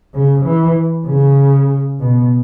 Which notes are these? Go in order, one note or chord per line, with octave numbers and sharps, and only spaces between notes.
C#3
E3
C#3
B2